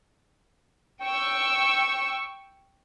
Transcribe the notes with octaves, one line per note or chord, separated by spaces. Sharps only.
G5 C#6 E6